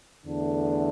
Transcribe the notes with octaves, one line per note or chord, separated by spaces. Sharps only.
E2 D3 A3 D4